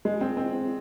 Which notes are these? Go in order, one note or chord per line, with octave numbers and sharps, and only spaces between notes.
G#3
C4
C4